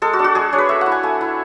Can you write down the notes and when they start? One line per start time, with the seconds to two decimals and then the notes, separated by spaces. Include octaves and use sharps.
0.02 G#3 A4
0.13 F#4
0.19 D4
0.24 F#4
0.35 G#3 G#4
0.53 D4 C#5
0.58 B4
0.69 A3 E5
0.81 E4 F#5
0.92 G#5
1.03 A3 G#5
1.21 E4